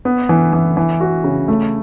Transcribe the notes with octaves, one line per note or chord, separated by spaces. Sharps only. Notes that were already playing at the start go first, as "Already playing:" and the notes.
B3
E3
E3
E3
F#4
C#3
A3